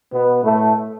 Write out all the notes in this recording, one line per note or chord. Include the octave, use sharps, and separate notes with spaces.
B2 B3
A2 A3